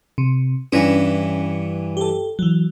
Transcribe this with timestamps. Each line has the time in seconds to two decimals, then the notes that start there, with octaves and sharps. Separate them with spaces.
0.18 C3
0.73 G2 E3 C#4 D4
1.97 G4 A4
2.39 E3 F#3